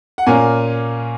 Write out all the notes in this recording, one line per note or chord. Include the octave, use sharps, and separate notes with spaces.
F#5
A#2 A#3 C#4 G#5